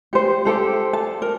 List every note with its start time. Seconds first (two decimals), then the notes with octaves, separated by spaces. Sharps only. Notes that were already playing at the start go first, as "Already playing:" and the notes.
0.13 G4 C5
0.45 G4 A4 C5
0.93 A5
1.22 A#4